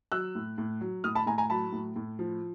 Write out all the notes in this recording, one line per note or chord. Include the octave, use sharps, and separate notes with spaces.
F#3 E6 F#6
A2
A2
F#3
A2 D#6 F6
A5 B5
A2 G#5 A#5
G#5 A#5
F#3 A5 B5
A2
A2
F3